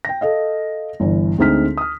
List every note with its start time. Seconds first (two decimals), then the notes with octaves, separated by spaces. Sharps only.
0.05 G5 A#6
0.21 A4 D#5 F5
1.00 G1 E3
1.38 D2 G#3 C4 D#4 F6 B6
1.77 D#6 F6